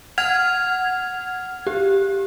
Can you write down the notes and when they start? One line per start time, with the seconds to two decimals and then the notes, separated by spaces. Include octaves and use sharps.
0.18 F#5 F6 G#6 F7
1.67 G4